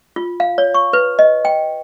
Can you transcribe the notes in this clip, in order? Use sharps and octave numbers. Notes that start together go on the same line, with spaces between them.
F4
F5
C#5
C#6
B4
D#5
G5